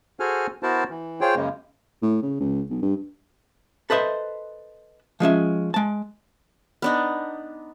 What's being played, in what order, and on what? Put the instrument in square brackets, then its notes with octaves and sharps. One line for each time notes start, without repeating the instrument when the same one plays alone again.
[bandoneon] F#4 G#4 A4 C5 G#5 F6
B3 E4 F#4 A#4 C5 A5
E3
F4 G#4 C5 C#5 G5
F#2 C#3 G#3 A#3
[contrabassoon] A2
C#3
C#2
B1
G2
[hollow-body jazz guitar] A4 B4 C5 D#5 E5
F3 G#3 C#4 E5
G#3 A5
[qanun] B3 D4 D#4